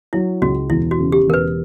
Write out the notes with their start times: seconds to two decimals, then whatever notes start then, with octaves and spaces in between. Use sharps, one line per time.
0.13 F#3 E4
0.42 C#2 F#4
0.70 E1 E4
0.91 F#4
0.99 C#3
1.12 G4
1.27 E1 A#4
1.34 B4